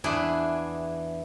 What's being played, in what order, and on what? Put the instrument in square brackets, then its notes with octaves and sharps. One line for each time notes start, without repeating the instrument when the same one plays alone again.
[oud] E2 E3 [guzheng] D4 E4 G#4